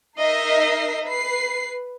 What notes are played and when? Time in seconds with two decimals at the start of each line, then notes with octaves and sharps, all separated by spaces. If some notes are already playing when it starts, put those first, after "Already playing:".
0.19 D#4 A#4 D#5 E5 C7
1.05 B4 C7